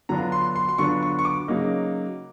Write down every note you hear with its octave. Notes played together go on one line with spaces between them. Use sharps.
D3 F#3 B3 D4 F4 A#5
C6
C6
C6
D3 F#3 B3 D4 F4 C#6
C#6
C#6
D6
C#3 F#3 A#3 D#4